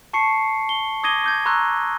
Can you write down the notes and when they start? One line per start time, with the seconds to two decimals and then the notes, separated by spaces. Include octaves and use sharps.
0.13 A5 C#6 C7 C#7
0.69 G7
1.03 D6 D#6 G#6 A#6 D#7 G7
1.24 D6 G6 G#6
1.46 A#5 C6 C#6 E6 F#6 G6